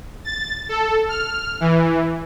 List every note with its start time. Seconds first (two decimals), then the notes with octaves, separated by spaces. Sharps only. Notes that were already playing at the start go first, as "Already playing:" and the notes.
0.25 A6
0.69 A4
1.09 F6
1.60 E3